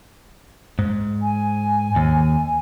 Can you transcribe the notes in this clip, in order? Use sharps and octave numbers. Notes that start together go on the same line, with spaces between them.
G#2
G#5
D#2